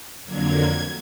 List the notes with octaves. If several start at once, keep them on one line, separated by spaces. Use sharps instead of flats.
F2 D3 F#3 A#3 G#6